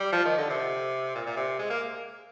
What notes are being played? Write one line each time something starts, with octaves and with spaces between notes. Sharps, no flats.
G3
F3
D#3
D3
C3
A#2
A#2
C3
G#3
A#3